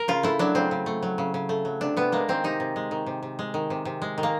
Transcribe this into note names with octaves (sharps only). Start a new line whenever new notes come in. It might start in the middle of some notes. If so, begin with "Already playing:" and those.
Already playing: A#4
C#3 F4
A3 E4
F#3 D4
C#3 C4
C#3
A3
F#3
C#3
C#3
A3
F#3
C3 D4
C3 B3
G#3 A#3
D#3 C4
C3 D#4
C3
G#3
D#3
C3
C3
G#3
D#3
C3
C3
G#3
D#3
A#3